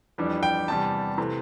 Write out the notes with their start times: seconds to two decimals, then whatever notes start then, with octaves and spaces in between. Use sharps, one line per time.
0.18 F2 E3 G3 D4
0.43 G5
0.68 E2 C3 G3 A5
1.18 C3 E3 A3